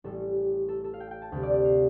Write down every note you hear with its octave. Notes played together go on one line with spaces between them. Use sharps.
A1 A2 G3 A4
A4
A4
F5
G5
G5
A5
D2 C3 G3 G5
D5
D5
F5